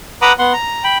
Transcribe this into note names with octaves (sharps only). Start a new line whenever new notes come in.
B4 F#5 A#5 B5 D6 D#6
B3 F#5 C6
A#5
G5 B5